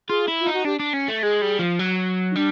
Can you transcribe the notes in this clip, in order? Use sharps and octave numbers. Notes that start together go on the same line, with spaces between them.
F4 G#4
E4
F4
D#4
F#4
D4 G4
D4
C#4
A3
G#3 G#4
G3
F3
F#3
D#4
G3 D4